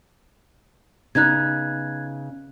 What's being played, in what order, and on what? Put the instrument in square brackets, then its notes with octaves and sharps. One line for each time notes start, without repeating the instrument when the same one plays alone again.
[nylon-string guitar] C#3 B3 D#4 [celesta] F#6 G#6